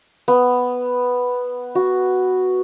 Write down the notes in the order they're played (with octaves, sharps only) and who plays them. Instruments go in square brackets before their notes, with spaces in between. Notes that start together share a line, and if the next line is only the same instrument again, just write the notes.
[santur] B3
F#4